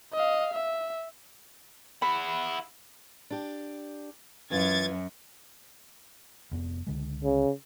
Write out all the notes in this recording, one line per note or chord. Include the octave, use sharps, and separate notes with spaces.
D#5 F5
E5
E4 F#5 B5
D4 G4
F#2 E3 F4 G#6 A6
F1 F2 B3
C#2 D3 G#3
C#3